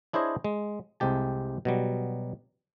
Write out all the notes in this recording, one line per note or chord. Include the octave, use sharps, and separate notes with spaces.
D4 E4 G#4 C5 C#5 D#5
G#3
C2 C3 G#3 G4 A5
B2 F#3 G3